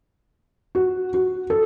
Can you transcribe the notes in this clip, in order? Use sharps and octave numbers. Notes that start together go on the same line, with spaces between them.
F#4
F#4
A4